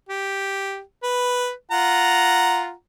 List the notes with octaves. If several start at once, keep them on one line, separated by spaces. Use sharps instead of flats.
G4
B4
F4 F#5 A#5